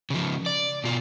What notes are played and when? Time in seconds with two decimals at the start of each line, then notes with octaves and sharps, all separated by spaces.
0.10 C#3 F3
0.46 D5
0.84 B2 F4